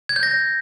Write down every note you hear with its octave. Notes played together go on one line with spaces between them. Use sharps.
G#6
G6
A#6